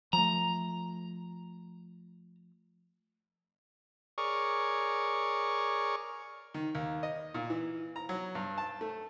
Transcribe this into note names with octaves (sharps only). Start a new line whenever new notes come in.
F3 A3 A#5
G#4 A#4 C#5 D5 C#6
D#3
D#2
D#5
A#2
E3
A#5
F#3
G2
A5
A3